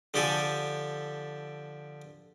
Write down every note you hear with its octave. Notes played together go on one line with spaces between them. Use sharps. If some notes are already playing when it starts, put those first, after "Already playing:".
D3 F3 G4 A4 G#5